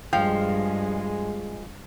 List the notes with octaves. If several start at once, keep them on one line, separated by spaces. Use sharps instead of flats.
G2 F3 G#3 F5 G5